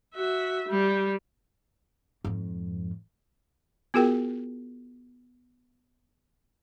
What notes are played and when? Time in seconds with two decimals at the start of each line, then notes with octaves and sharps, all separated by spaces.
0.15 F#4 E5
0.69 G3
2.24 F2 G#2
3.94 B3 F4 F#4 G#4 A#4 G5